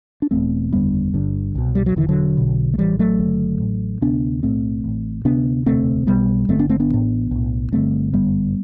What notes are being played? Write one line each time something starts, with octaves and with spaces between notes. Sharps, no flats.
D4
E1 E2 B2 A3 C4
F#1 E2 D3 G3 B3
G1 G2 D3
C2 B2
G3
F#3
E1 D2 D3 E3
D3 F#3
B1 B2
A3
A1 A2 E3 G3
F#3 A3
F#1 F#2 D3
A1 A2
D2 C3 B3 D4
B1 A2 A3 C4
A1 A2
D2 C3 B3 D4
E1 D2 C3 A3 C4
B1 B2 G3 B3
G1 F#2 D3 A3 C4
B3 D4
A3 C4
B3 D4
A1 A2
B1 A2
G1 G2 D3 A3 C4
G1 F#2 D3 G3 B3